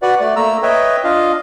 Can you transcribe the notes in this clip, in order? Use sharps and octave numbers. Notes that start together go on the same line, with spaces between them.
F#4 B4 D5 F#5
A3 D5
A3 A#3 A#5 E6
B4 C#5 D#5 E5 G5
D4 F4 D#5 F5